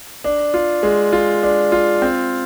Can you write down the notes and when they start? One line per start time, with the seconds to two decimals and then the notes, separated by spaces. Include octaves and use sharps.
0.24 D4
0.54 F4
0.83 G#3
1.13 F4
1.43 D4
1.72 F4
2.02 C4